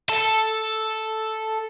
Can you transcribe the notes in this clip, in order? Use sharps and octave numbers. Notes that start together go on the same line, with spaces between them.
A4 A5